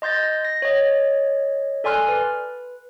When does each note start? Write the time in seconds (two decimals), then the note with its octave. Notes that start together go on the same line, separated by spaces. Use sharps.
0.02 D#5 C6 G6 A6 A#6
0.45 A#6
0.62 C#5 D#5
1.84 A4 D5 G#5 C6 F6 F#6
2.08 B4